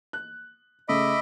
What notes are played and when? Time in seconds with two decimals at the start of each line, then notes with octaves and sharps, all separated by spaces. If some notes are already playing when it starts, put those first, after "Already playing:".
0.13 F#6
0.89 C#3 A3 D#5 E5 B5 D6